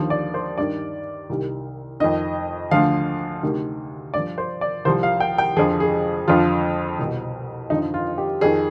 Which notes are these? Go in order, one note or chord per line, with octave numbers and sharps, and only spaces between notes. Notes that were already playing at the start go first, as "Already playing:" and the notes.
Already playing: D#2 D3 F3
D5
C5
G2 D#3 D5
C2 C3 D#3
F2 D#3 D#5
D2 D3 F3 F5
D2 C3 D#3
G2 F3 D5
C5
D5
C2 C3 F3 C5
F5
G5
G5
F2 D3 F3 G#4
G#4
F2 D3 F3 F4
C2 B2
F2 D3 F3 D#4
F4
G4
F2 D#3 G#4